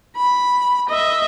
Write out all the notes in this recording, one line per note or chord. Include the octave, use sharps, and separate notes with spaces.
B5
D#5 E5